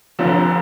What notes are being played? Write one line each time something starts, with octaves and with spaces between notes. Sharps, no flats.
F1 F2 D3 F3